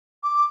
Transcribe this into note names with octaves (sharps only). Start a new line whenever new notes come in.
D6